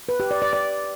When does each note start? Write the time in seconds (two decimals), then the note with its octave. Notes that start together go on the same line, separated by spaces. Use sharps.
0.09 B4
0.20 G4
0.31 D5
0.42 D5
0.53 D5